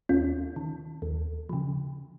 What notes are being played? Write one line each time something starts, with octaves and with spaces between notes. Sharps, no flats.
D#2 C#4 F4
D#3
D#2
C#3 F3